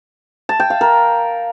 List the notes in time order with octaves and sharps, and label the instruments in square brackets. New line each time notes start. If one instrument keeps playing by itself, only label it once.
[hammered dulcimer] A5
G5
F5
A#4